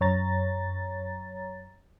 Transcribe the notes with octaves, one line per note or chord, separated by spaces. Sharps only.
F#2 C#5 A#5 A6